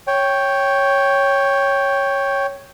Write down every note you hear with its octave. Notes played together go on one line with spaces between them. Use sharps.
C#5 G5